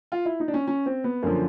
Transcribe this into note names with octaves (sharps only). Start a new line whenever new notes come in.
F4
E4
D#4
D4
C#4
C#4
C4
B3
F#2 D3 F3 A#3